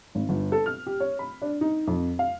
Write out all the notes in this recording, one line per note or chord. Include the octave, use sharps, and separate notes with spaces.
G#1
G1
A4
F6
G4
C#5
B5
D4
D#4
F2
F5